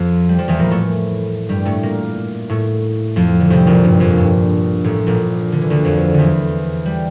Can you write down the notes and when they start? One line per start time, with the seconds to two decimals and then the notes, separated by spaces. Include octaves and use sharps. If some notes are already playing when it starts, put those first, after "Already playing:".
Already playing: F2 F3
0.29 G3
0.39 F3
0.48 E2 E3
0.59 A#2 A#3
0.70 A2 A3
1.49 G2 G3
1.65 A2 A3
1.83 A#2 A#3
2.50 A2 A3
3.16 F2 F3
3.40 D3
3.50 C2 C3
3.67 A#1 A#2
3.84 G2
4.00 F2
4.18 G2
4.84 A1 A2
5.07 A#1 A#2
5.52 D3
5.62 E3
5.70 D2 D3
5.85 F2 F3
6.14 E2 D3 E3
6.85 G3